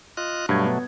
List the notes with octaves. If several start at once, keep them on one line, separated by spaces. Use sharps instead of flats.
F4 D#5 F#6
G2 B2 F#3 A3 G#6
B3